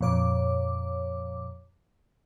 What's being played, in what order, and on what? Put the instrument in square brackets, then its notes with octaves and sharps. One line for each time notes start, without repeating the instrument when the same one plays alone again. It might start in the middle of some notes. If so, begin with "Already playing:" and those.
[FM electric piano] F2 A#2 C#5 D6